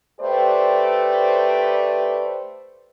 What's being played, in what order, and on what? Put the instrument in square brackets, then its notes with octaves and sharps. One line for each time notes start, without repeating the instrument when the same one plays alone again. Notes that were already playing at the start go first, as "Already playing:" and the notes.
[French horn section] A3 G4 B4 C5 D5